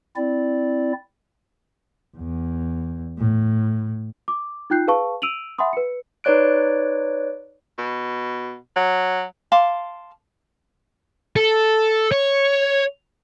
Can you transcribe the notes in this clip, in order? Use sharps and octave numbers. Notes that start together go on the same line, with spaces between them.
C4 E4 D5
E2
A2
D6
D#4 F4 G5 F#6 G6 C7
G#4 B4 F5 A5 C#6
E6 D7 D#7 F7 F#7
E5 F#5 G#5 B5 C6 D#6
B4 C#7
D#4 B4 C#5 D5 F#6 D7
B2
F#3
F5 A5 C6 D6
A4
C#5